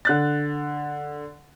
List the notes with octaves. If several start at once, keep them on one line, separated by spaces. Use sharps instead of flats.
D3 F#6 A6